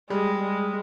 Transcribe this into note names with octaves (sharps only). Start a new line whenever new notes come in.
G3 G#3
G#3